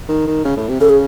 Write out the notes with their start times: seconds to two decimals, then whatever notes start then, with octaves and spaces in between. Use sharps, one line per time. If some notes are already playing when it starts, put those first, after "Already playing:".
0.09 D#3
0.27 D#3
0.45 C#3
0.57 A2
0.69 C3
0.80 C#3 A4
0.90 G#4